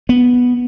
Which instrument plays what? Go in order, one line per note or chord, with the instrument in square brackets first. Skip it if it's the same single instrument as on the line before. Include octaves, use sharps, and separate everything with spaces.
[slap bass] B3